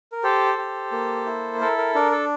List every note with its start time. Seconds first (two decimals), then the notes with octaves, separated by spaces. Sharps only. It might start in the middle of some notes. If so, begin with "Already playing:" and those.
0.12 A#4
0.24 G4 A4 C5
0.58 G4
0.92 A#3
1.26 E4
1.61 A4 A#4
1.78 A#4
1.95 D4 A#4
2.12 A4